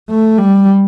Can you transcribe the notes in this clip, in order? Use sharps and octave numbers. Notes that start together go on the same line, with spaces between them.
A3
G3